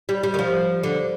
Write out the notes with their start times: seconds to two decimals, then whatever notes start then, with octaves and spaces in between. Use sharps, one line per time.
0.09 G3
0.23 G3
0.34 D#3
0.39 F3
0.83 D3